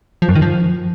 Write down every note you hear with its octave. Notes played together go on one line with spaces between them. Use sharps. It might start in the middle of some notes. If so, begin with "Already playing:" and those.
F3
F#2
D#3
F3